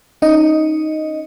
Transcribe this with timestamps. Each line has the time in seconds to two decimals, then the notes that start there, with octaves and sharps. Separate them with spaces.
0.22 C#4 D#4 D#5